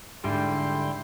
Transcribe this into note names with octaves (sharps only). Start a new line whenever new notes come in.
G#2 D3 G3 E4 G5 C6